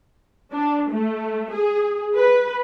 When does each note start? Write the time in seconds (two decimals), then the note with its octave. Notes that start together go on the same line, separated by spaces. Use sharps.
0.52 D4
0.90 A3
1.51 G#4
2.15 B4